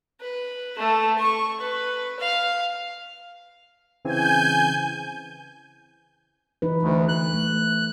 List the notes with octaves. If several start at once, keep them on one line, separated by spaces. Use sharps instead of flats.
B4
A3 A4
C#6
B4
F5
C#3 E3 C4 G#5 G6
E3 D#4 B4
D2 E3
F#6
A3